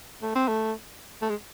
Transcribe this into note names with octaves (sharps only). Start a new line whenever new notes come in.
A3
C4
A3
A3
G#3